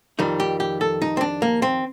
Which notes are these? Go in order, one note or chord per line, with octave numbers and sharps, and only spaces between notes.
F2 D#3 G3 D#4
G4
G4
A4
D#4
C4
D4
A#3
C4